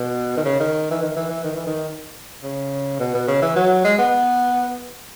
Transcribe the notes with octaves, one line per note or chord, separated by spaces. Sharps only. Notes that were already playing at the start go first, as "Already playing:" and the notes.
Already playing: B2
D#3
C#3
D#3
E3
D#3
E3
E3
D#3
E3
D#3
C#3
B2
B2
C#3
E3
F#3
G#3
B3